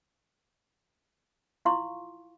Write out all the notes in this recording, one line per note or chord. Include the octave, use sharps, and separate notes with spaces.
E4 F4 F5 C6 C#6